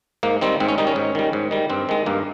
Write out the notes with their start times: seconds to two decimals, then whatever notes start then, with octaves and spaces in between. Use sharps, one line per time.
0.23 G#2 A#3
0.41 D#3 G3 C4
0.60 G#2 C4
0.68 C#4
0.78 D#3 G3 D#4
0.87 C#4
0.96 G#2
1.15 D#3 G3
1.33 G#2
1.51 D#3 G3
1.70 G2 C4
1.89 D#3 G#3
2.06 G2 A#3